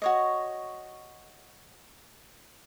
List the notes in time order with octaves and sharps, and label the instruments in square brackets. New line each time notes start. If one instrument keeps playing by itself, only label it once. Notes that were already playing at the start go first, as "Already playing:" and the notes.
[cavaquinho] F#4 C#5 D#5